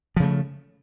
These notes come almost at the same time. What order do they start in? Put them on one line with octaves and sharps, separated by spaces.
F3 C#3 A3